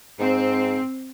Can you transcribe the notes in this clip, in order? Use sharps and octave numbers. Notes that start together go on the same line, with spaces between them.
G#2 C4